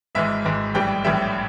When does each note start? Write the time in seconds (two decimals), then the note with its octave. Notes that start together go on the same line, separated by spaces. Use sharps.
0.15 G#1 G#2 E3 G#3 E5
0.45 G#1 G#2 E3 G#3
0.74 A#1 A2 E3 G3 G5
1.04 A#1 A2 E3 G3 E5